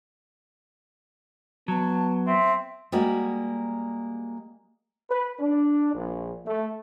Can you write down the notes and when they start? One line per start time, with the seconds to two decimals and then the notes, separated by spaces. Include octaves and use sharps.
1.68 F#3 B3 A5
2.27 C4 E5
2.92 G3 G#3 A#3 F#4
5.10 B4
5.40 D4
5.94 A#1
6.45 A3